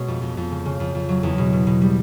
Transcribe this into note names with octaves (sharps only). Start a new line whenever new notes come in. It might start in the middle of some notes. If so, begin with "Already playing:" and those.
Already playing: B2 G#3 C#4
F2
F2
F2
C#3
C#3
F2
F2
F#3
E2
B2
B2
B2
G3